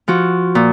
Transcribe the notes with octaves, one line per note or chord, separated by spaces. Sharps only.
F3 F#4
A#2